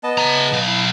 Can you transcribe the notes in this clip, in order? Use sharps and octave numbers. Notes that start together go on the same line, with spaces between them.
B3 D#5 A5
C#3 A#5
B1 F5
E4 A5